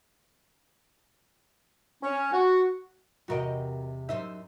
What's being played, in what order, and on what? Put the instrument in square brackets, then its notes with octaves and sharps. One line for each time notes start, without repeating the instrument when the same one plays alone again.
[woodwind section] C#4
F#4
[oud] E2 C3 D#5 [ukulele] F#4 A#4 G5
[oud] F#2 C5 E5 [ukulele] D#4